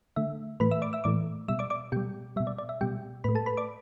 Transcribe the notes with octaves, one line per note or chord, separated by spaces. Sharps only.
D3 A3 E5
A2 E3 A3 B4 B5
E5 E6
D5 D6
E5 E6
A2 E3 A3 D5 D6
B2 G3 E5 E6
D5 D6
D5 D6
B2 G3 G4 G5
B2 G3 E5
D5
D5
E5
B2 G3 G4 G5
A2 A3 B4 B5
A4 A5
B4 B5
D5 D6